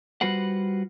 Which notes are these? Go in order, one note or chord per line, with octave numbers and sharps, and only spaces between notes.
G3 F4 F#4 B4 C5 F#5